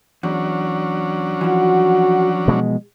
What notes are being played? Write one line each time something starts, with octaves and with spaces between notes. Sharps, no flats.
E2 F#3 C#4 D4
E3 F3 F#4
B2 G#3